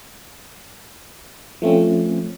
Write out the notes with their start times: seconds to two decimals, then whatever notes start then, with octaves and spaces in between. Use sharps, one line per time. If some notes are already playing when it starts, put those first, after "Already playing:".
1.62 F3 A3 C4 C#4